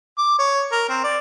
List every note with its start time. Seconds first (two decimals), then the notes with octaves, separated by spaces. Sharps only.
0.18 D6
0.39 C#5
0.72 A#4
0.89 C4
1.04 D5